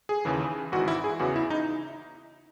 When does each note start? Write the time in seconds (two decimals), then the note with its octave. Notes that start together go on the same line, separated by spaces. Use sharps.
0.09 G#4
0.25 D#2 C#3 E3
0.72 G#1 G#2 E3 F#4
0.88 E4
1.04 G#4
1.19 E2 C#3 E3 F#4
1.36 E4
1.50 D#4